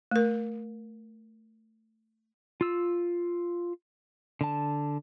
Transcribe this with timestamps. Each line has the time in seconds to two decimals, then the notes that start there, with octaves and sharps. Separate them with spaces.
0.11 A3 A#4
2.61 F4 E6
4.41 D3 A5